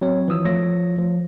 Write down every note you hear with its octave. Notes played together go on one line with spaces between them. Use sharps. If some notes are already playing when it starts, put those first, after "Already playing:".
F#3 C4 C#5
E3 F3 D#6 E6
F3 A3 F4 C#5 A#6
F3